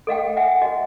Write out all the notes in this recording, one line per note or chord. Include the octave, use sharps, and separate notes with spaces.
A4 D#5 F5 G5
E5 F#5 G#5
F#4 D#5